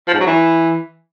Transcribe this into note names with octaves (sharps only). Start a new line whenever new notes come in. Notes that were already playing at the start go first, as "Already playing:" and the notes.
F3
G#2
F#3
E3